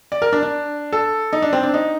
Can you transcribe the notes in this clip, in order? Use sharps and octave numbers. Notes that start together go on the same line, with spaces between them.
D5
A#4
D4
D4
A4
D#4
D4
C4
D4
D#4